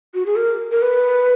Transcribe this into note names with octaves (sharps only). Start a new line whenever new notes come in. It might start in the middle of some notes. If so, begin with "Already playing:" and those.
F#4
G#4
A#4
A#4
B4